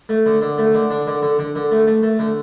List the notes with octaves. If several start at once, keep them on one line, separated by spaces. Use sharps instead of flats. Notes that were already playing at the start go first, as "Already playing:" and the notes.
A3
D3
D3
A3
D3
D4
D3
D3
D3
D3
A3
A3
A3
D3